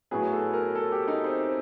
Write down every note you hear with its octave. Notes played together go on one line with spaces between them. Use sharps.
A2 F#3 B3 G#4
A4
A#4
A4
G4
D#4
C4